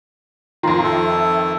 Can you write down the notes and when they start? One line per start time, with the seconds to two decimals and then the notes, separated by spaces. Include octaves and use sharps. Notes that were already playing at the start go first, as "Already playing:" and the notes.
0.63 F2 D#3 F4 A#5 C6
0.83 A4 E5